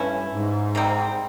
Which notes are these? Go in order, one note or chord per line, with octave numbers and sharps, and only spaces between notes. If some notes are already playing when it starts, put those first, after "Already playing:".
Already playing: G2 E3 A3 C#4 E4
G#2
C3 D#3 G3 C4